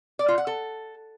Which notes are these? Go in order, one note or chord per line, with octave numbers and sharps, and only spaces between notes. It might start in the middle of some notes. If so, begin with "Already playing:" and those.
D5
F4
F#5
A4